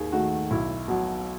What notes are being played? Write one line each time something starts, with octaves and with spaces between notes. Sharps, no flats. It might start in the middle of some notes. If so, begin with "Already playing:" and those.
Already playing: D#2 D#3 G#4
D#3 A3 F#4
B1 E4
B2 F#3